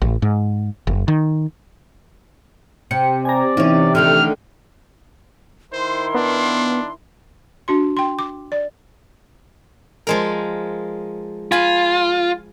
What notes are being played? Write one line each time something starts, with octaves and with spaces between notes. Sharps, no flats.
A1
G#2
F#1
D#3
C3 C#7
D5 G#5 A#5
C3 E3 A#3 C#4 D#4
D3 D#3 A3 F6
D#3 E4 A#4 C5 C6
B3 D4
D4 F#4 C6
G5 C6
D6
D5
F3 G#3 A#4
F4 G#5 B5